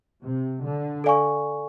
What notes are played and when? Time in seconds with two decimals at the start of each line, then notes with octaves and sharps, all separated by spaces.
0.21 C3
0.64 D3
1.04 A4 D5 F5 G#5 C#6